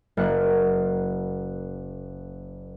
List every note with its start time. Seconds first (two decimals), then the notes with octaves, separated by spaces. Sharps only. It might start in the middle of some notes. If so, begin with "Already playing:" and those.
0.17 F#1 A#3 F#5